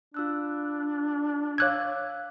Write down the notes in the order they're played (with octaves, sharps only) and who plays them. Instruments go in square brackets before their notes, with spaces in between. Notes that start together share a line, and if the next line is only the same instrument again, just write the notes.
[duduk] D4 [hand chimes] F4 E6 F#6
[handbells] C#5 F#6 G#6 [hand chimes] F5 D6 E6